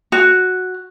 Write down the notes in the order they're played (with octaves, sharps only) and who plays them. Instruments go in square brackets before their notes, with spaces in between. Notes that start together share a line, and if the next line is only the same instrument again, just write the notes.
[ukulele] F#4